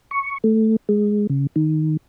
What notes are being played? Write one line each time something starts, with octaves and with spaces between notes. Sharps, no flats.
C#6
A3
G#3
C#3
D#3